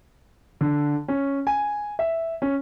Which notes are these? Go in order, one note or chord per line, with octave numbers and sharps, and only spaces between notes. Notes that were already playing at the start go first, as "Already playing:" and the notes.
D3
C#4
G#5
E5
C#4